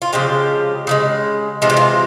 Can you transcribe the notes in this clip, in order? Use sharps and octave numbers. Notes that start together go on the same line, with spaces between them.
F4
C#3 F3 G#3 G4
C#3 F3 G#3
C3 E3 G#3 F4
G4
F4